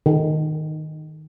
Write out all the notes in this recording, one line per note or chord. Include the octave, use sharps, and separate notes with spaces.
D#3